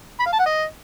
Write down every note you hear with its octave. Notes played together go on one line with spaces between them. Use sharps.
B5
F5
A5
F#5
D#5